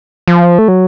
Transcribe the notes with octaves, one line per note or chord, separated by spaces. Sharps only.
F3
A3
F#3